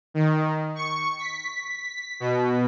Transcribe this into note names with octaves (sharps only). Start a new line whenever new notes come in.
D#3
C#6
B6
B2